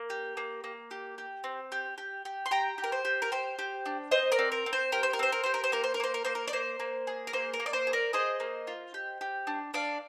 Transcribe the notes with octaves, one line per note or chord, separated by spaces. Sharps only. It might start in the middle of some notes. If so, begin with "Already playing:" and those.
Already playing: A#3
G4
A#3
A#3
G4
G4
C4
G4
G4
G4
C6
G4 G5 A#5
G4
A#4
C5
G4
A#4
G4 C5
G4
D4
C4 C5 D#5
A#4 D5
C4
A#4
C4
C5
G4 A#4
C5
A#4
C4 C5
A#4
G4 C5
A#4
C5
A#3 A#4
C5
A#4
A#3 C5
A#4
A#3 C5
A#4
D5
A#3 C5
A#3
G#4
A#4
A#3 C5
A#4
A#3
D5
C5
G#4
A#4 D5
G#4 C5 D#5
A#3
F4
G4
G4
D4
D4 D5 F5